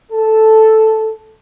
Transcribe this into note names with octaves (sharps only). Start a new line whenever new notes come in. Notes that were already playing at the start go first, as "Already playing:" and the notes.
A4